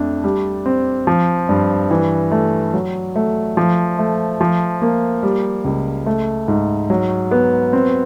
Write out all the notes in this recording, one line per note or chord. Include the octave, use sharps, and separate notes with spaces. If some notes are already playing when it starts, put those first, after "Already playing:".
Already playing: F2 A3 D4
G3
C4
F3
G2
E3
A3
F#3
A3
F3
A3
F3
A#3
G3
C#2
A3
G#2
F#3
B3
C4